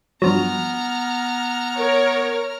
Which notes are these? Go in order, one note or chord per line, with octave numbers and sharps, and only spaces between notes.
G2 F3 F#3 B3 A#5 F6
A#4 C#5